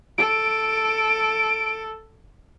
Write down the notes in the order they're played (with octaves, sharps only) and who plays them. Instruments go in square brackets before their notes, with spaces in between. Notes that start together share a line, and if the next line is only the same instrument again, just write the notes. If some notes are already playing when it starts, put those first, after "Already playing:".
[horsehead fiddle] A4 [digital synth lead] D7